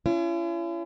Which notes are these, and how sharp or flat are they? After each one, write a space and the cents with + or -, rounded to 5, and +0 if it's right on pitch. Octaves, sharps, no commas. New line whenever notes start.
C#4 +25 E4 +45